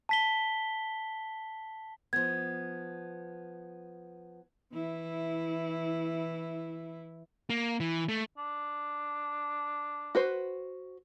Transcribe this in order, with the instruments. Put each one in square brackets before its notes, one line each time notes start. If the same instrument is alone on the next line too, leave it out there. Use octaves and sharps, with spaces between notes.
[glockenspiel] A5 B6 G7
[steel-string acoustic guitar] F3 B3 [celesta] G#6
[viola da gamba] E3 E4
[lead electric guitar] A#3
E3
A3
[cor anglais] D4
[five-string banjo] F#4 B4 C5